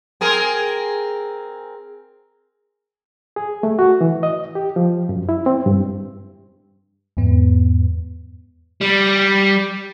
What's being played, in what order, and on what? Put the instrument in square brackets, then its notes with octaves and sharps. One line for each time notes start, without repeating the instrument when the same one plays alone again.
[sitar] C4 G#4 A#4
[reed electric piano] G#4
A3
F#4
E3
D#5
G4
F3
F#2
E4
C4
G2
[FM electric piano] E2 G#2 B3
[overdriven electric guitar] G3